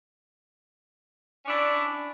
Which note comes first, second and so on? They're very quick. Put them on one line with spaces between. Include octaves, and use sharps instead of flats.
C#4 D4 E4